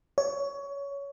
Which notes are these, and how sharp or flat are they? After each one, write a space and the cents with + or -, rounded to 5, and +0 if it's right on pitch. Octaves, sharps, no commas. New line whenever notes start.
C#5 +20